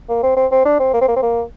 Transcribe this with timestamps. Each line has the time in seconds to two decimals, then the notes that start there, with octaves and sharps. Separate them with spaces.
0.09 A#3
0.23 C4
0.37 C4
0.51 C4
0.65 D4
0.79 C4
0.94 A#3
1.01 C4
1.08 A#3
1.16 C4
1.23 A#3